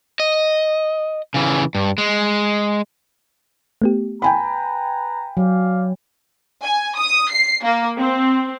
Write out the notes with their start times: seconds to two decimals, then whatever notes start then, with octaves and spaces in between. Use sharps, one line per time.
0.20 D#5
1.34 C#3 E3
1.75 G2
1.98 G#3
3.82 A3 B3 G4
4.22 B4 G5 G#5 A#5 B5
5.37 F#3 D5 F5
6.63 G#5
6.97 D#6
7.31 C7
7.64 A#3
7.99 C4